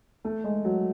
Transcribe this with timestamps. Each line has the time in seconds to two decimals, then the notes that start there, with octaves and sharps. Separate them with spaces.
0.25 A3
0.44 G#3
0.65 F#3